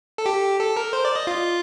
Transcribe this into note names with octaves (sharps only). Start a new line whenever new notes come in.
A4
G4
A4
A#4
C5
D5
D#5
F4